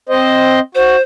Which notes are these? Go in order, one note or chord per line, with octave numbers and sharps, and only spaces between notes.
C4 C5 D#5
F#4 C5